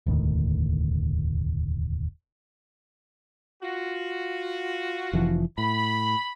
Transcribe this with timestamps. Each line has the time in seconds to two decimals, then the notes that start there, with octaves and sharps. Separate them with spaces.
0.06 E1 D2 A2 D#3
3.62 F4 F#4
5.13 F1 E3 F3
5.58 A2 B5